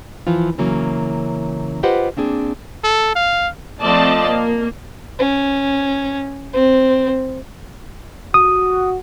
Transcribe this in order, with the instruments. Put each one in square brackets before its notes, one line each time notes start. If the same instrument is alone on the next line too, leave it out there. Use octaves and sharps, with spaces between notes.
[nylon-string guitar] E3 F3 F4
C#3 E3 F#3 A#3 C#4
F4 G4 B4 C5 D#5 F#5
A#3 C4 D4 G#4
[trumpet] A4
F5
[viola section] F3 A3 C4 D5 D#5 A5
A#3
[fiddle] C#4
C4
[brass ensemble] F#4 [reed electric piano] D#6